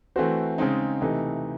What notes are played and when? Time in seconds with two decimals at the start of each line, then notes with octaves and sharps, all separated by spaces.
0.16 E3 A3 C4 F#4 C5
0.58 C#3 G#3 C4 D#4
1.02 C3 E3 A3 D#4